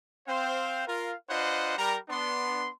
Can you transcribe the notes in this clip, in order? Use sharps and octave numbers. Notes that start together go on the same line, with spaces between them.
C4 C5 F5
F4 A#4 F5
D4 F4 B4 C5 D#5 F#5
G3 A#4 A#5
B3 D4 C6